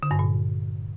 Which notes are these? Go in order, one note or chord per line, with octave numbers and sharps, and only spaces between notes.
D3
G2
A#2